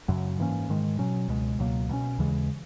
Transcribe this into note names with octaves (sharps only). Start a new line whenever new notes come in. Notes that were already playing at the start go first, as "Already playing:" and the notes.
F#2 C#3 F#3
G#2 E3 A#3 C#4
G#2 D#3 G#3
B2 F#3 C#4
C#2 B2 G#3
C#2 B2 F#3 A#3
B2 F#3 C#4
D#2 C#3 E3 G#3